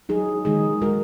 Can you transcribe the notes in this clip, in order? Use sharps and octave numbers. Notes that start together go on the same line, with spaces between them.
F#3 D#4 G#4
D#3 G#3 D#4 G#4
G#3 F#4 A#4